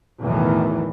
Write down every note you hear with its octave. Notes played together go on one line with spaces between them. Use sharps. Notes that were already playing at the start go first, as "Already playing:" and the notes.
B1 E2 A2 D#3 E3